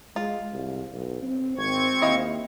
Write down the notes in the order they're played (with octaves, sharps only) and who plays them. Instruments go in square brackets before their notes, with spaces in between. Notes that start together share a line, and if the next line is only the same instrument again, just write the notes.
[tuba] G#3 [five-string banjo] F4
[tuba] C2
B1
C4
[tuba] G#1 [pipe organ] C4 C#6 G#6
[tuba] D#2 [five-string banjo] E4 D#5 F5